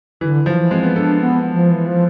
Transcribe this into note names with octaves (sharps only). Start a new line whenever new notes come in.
D3 E3
F3
E3
G#3 C4
B3
D4 A4
B3
F3
E3
F3